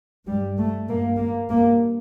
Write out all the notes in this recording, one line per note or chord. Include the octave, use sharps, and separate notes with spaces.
G2 G3
A3
G2 A#3
A#3
G2 A#3